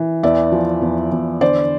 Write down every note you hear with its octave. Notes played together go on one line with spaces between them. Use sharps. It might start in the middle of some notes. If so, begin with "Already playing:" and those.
Already playing: E3
E2 D5 E5
F3
E2
E2
D3 C5 D5